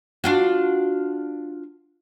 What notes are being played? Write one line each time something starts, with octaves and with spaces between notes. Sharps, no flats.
D4 F4 F#4